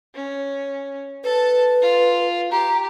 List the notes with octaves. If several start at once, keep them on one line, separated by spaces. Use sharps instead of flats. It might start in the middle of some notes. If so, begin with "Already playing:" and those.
C#4
A4 B4 A5
F4
G4 A#5